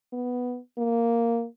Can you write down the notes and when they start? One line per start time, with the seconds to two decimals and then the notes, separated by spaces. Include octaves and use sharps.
0.13 B3
0.78 A#3